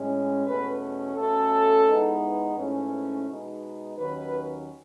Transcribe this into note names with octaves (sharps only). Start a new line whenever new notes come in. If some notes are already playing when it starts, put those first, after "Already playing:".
Already playing: A2 G#3 C#4
E2 B2 A3 C#4 B4
B2 A3 C#4 A4
G#2 E3 G#3 B3 D#4
G#2 E3 A3 C#4
B2 G#3 B3 D#4
D#2 D#3 F#3 C#4 B4